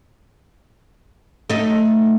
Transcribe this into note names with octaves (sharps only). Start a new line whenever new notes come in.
A3 D#4